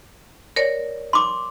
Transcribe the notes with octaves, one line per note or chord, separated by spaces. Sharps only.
A#4 C#5 D5
C6 D6